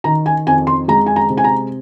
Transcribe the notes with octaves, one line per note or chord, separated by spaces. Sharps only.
D#3 A#5
G#5
F2 G#5
C6
G#3 A#5
G#5
A#5
C3
G#5
A#5